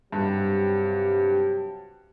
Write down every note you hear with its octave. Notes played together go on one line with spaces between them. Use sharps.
G2 C3 F#3 G4